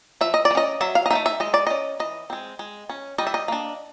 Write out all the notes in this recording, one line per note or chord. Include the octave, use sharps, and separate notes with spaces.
F3 E5
D#5
D5
G#3
C#4 D#5
F#3 E5
F5
D#5
A3 C4 D#4 E5
E5
G#3 D#5
D5
C#4 D#5
E3 D#5
G#3 C4
G#3
C#4
G3 D#5
E5
D#5
A#3 D4